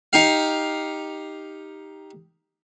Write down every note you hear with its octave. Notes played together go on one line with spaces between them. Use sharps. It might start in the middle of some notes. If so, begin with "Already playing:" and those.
D#4 G4 F5